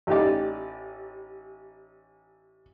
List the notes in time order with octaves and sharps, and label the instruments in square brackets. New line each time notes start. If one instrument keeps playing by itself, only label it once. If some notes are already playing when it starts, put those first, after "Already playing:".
[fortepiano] A1 D#4 G4 D5